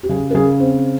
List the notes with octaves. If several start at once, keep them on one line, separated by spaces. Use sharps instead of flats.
G4
C#3 G#4
A#4
C#3 G#4
C4